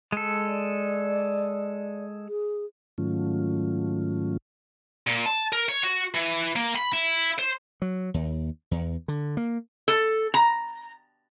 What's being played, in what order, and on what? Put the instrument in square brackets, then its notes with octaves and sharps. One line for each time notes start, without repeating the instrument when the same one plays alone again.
[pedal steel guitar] G#3 A4
[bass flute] D5
G#4
[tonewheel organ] G#2 D#3 F#3 A3 C#4 F4
[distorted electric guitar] A#2
A5
A#4
C#5
F#4
E3
A#3
B5
E4
C5
[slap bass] F#3
D#2
E2
D3
A#3
[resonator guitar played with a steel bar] A4
A#5